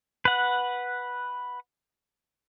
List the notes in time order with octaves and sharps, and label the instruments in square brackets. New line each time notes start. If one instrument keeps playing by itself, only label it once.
[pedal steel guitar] B4 F#5